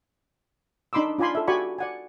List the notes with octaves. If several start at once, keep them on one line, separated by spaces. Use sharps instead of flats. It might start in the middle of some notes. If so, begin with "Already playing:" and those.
D4 D#4 B5 C6 D6 E6
D4 F4 D5 G#5 B5 C6
A4 E5
F#4 G4 D5 G#5 B5 C#6
D5 F#5 G#5